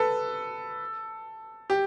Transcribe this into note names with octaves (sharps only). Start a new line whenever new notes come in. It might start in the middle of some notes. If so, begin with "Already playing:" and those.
Already playing: A4 B4
G4